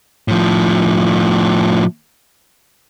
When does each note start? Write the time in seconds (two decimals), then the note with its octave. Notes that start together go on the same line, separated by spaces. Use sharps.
0.28 A2 F3